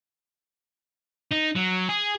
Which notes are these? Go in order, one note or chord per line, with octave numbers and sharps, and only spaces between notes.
D#4
F#3
G#4